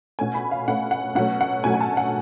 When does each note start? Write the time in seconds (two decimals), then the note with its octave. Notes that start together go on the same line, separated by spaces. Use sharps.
0.19 B2 A3 C#4 G#5
0.34 B5
0.51 F5
0.68 B2 A3 C#4 F#5
0.91 F#5
1.15 B2 F#3 A3 C#4 F#5
1.41 F#5
1.64 B2 F#3 A3 C#4 G#5
1.74 G#5
1.81 A5
1.97 F#5